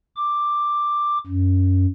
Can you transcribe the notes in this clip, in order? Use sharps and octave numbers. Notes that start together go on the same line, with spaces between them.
D6
F#2